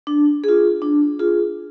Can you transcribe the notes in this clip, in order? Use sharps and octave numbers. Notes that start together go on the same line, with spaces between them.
D4
F4 G#4
D4
F4 G#4